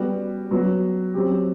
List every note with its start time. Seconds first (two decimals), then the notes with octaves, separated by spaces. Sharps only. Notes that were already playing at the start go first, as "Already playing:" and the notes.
Already playing: G3 B3 F#4
0.51 F#3 B3 F#4
1.14 F#3 C4 G4